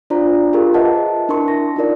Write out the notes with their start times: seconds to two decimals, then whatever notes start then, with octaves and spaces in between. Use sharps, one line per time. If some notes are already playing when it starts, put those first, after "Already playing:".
0.10 D4 F4 C5 D5 A#5
0.53 F4 G4 G#4 A#4
0.74 B4 C5 D#5 E5 F#5 A5
1.29 D4 E4 A#4 A5 C6 C#6
1.48 A#6
1.76 D#4 F4 A#4 D5